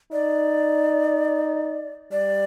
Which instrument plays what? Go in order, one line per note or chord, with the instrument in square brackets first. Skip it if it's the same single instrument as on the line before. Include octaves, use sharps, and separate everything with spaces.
[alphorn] D#4 [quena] D5
[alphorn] G3 [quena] D5